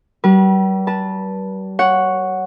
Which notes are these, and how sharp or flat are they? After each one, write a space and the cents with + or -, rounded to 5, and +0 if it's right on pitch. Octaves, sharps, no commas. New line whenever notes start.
G3 -40 B4 -40
B4 -35 A5 +0
C#5 +0 F#5 +0